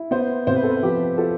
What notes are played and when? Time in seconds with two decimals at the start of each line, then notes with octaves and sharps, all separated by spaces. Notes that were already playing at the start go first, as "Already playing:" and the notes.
Already playing: E4
0.11 B3 C5
0.47 C3 C5
0.56 B4
0.63 A4
0.71 B4
0.83 F3 G4
1.18 F4 A4